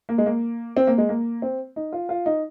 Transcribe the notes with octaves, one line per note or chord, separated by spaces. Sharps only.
A#3
G#3
A#3
C4
A#3
G#3
A#3
C4
D#4
F4
F4
D#4